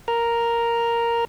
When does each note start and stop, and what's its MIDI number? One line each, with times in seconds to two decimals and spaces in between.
0.08 1.25 70
0.08 1.25 82